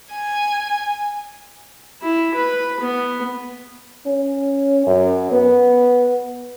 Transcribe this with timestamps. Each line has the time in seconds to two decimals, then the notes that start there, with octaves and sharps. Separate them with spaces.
0.13 G#5
2.02 E4
2.35 B4
2.80 B3
4.06 C#4
4.86 F#2
5.32 B3